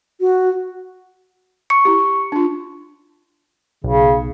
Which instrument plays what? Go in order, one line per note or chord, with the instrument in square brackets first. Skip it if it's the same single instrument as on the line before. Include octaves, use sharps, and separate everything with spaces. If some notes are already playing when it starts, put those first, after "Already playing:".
[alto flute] F#4
[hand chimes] C#6 C#7
[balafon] E4 G4
D4 F4
[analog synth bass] B1 [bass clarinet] C#3